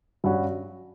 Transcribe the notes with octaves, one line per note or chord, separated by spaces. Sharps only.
G2 F#3 C#4 F#4